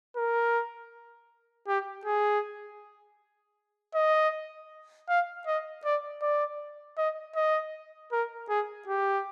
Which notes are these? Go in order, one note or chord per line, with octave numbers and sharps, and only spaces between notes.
A#4
G4
G#4
D#5
F5
D#5
D5
D5
D#5
D#5
A#4
G#4
G4